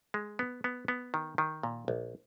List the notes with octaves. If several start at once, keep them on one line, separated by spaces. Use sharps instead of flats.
G#3
B3
B3
B3
D#3
D#3
A#2
A#1